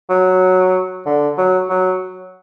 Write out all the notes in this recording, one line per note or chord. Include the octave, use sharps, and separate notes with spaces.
F#3
D3
F#3
F#3